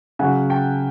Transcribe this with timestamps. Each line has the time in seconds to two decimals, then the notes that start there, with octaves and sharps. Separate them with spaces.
0.19 C#3 F#3 F#5 G#5
0.50 G5 A5